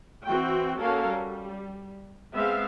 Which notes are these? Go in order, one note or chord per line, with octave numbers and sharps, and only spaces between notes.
E3 C4 F#4 G5
A#3 C#4 F#4 A4 A#4 F5
G3
G#3 B3 C4 E5 F5